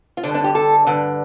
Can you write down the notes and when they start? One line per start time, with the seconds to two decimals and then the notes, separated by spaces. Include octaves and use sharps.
0.17 F4
0.23 D3 D4
0.28 G2
0.34 D4
0.44 G4
0.55 A4
0.87 G2 D3